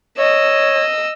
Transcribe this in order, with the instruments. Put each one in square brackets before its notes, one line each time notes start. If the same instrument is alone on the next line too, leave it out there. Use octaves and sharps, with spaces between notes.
[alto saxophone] C#5 [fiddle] D#5 E6